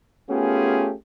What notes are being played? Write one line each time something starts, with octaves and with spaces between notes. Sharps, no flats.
A3 B3 C#4 F4 G4 G#4